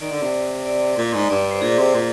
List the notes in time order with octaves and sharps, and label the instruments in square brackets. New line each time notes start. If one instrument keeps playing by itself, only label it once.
[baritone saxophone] D#3 [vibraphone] D5
[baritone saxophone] D3
C3
[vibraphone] D5
[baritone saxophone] A#2
G#2
[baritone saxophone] G2 [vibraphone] D5
[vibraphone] D5
C5
[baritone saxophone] A#2 [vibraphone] G#4
[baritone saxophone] C3
A#2